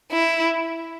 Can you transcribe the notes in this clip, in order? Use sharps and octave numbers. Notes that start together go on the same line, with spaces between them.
E4